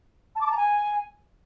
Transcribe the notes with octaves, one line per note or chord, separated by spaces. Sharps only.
A5
D6
A5
A#5
G#5